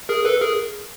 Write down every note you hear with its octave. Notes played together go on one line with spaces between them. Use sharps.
G#4 A#4
A4 B4
G#4 A#4